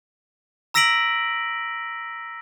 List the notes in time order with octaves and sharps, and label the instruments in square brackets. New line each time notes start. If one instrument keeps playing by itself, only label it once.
[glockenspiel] A#5 E6 A#6 B6 D7 F#7